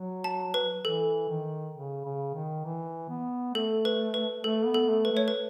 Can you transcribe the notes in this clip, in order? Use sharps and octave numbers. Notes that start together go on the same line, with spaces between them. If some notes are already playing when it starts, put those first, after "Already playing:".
Already playing: F#3
A5
B4
E3 A4
D#3
C#3
C#3
D#3
E3
B3
A3 A4
B4
B4
A3 A4
B3
A4
A3
B4
A3 C#5
B4